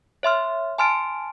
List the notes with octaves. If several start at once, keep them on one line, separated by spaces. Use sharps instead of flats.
C#5 E5 C6 F6
G#5 A5 C6 F6 A6 D7